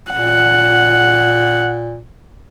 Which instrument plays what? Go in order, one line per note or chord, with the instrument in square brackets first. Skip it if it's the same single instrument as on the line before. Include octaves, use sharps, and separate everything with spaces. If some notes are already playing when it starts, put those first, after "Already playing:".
[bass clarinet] A#2 [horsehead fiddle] F#5